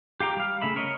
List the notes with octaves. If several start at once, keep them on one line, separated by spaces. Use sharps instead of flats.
G4 F5 G5 A#5 D6
G3 F5
C#3 A3 E5 B5
A#4 C#5 D#5